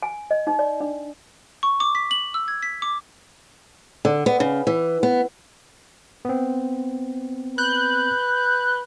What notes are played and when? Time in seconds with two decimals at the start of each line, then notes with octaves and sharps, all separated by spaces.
0.02 G#5
0.31 D#5
0.47 D#4
0.59 D5
0.80 D4
1.63 C#6
1.80 D6
1.95 B6
2.11 F#7
2.34 E6
2.48 G#6
2.63 B6
2.82 D6
4.05 D3
4.26 B3
4.40 C#3
4.67 E3
5.03 B3
6.25 B3 C4
7.58 B4 F#6 G6